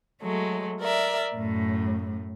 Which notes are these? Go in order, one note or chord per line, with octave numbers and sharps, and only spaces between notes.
F#3 G#3 A3
A#4 D5 E5
F#2 A2